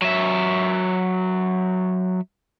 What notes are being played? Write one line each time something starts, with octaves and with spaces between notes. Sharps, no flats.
F#3 E5